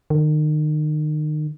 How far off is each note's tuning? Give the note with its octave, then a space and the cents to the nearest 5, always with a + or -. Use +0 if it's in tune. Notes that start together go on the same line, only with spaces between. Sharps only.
D#3 -35